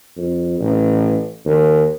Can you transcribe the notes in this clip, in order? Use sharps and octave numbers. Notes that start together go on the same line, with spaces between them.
F2
A1
D#2